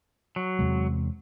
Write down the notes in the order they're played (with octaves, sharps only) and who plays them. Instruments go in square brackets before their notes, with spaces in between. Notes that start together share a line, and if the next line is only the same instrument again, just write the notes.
[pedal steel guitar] F#3
[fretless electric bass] E2 C3 G#3